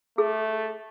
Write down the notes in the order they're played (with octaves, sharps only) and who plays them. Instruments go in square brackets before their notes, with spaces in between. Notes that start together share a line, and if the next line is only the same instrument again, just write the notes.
[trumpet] A3 [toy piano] G#4